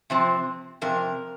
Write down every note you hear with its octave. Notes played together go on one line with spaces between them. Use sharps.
C3 F3 C4
F2 C3 A#4